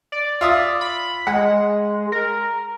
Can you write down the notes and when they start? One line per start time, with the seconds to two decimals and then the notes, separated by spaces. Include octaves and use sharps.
0.12 D5
0.41 F4 E5 D#6
0.81 B5
1.27 G#3 F#5
2.12 A#4